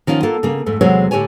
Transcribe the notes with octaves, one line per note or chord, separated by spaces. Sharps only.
D#3 F3 C#4 F4
A#3 D4 F4 A4
C#3 A#3
F2 G#2 A3
E2 C3 F#3 G#3 C5 C#5
A2 D3 G4 C#5 G#5